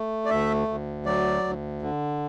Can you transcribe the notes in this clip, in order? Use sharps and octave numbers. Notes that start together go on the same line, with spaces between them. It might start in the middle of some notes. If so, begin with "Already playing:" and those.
Already playing: A3
D5
D2 E5
D2
F#3 D5
D2
D3